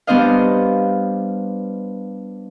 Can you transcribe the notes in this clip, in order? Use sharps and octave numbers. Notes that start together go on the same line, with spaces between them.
G3 B3 D4 C5 D#5 F5